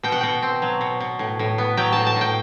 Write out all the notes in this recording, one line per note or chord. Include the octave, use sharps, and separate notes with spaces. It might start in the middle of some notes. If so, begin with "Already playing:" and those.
B2 G5
F#5
B2 G5
C4
F#3
B2
B2
A2
A2
B3
F#3 G5
A2 A5
A5
A2 G5